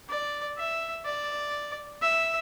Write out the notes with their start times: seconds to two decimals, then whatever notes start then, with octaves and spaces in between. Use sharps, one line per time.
0.10 D5
0.58 E5
1.06 D5
2.02 E5